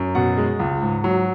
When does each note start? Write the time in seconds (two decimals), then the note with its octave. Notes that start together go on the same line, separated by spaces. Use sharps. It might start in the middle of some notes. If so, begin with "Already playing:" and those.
Already playing: F#2
0.15 B2 F#5
0.38 G#3
0.59 C#2
0.82 G#2
1.04 F#3